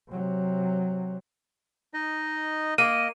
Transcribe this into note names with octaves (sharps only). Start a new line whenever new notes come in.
C3 F#3
D#4 D#5
A#3 D#5 D#7